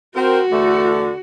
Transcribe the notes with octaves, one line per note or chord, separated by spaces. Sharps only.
C4 F#4 A#4
E2 D3 A3